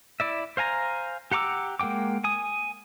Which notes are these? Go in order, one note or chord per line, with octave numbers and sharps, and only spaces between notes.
E4 D5 E5
C5 F5 G#5 A#5
G4 F#5 A#5 D6 E6
G#3 A#3 F#5 G5 D6
G#5 D#6